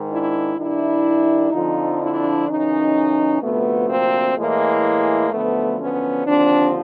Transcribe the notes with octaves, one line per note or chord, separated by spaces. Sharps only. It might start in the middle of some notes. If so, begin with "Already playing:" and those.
Already playing: G#2 D#3
D4 E4
G2 D#3 D4 E4
F2 D3 F3 D#4 F4
D4 E4
F#2 C#3 E3 C#4 D#4
D2 C3 F3 A3 B3
A#3 C4
A2 E3 G#3 A#3
F#2 D3 F3 A3 B3
B3 C#4
D#2 D3 F3 C4 D4